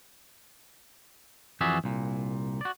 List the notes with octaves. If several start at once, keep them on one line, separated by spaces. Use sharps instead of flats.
F2 E3 F#4 G#4 D5 E5
C2 A#2
F#4 D5